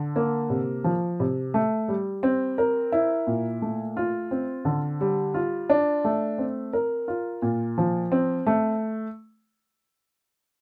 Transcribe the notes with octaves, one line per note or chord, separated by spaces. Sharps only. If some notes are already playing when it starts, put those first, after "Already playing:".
Already playing: D3
A#3
C3
F3
C3
A3
G3
C4
A#4
E4
A#2
A3
F4
C4
D3
G3
F4
D4
A3
C4
A#4
F4
A#2
F3
C4
A3